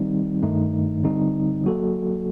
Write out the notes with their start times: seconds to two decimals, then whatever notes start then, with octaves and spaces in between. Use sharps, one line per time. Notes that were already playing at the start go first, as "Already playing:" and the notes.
Already playing: D#3 G3 C4 D#4
0.43 G2 D#3 A3 D#4
1.04 D3 G3 C4 D#4
1.64 F#3 A#3 F#4 A4